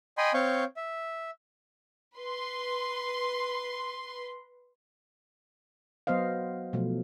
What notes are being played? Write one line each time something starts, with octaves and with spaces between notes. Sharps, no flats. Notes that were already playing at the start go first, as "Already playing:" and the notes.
D#5 G5 G#5 B5 C6
C4 C#5 F5 C#6 G6
E5
B4 C6
F#3 B3 C5 D#5 F5
B2 F3 F#3 A3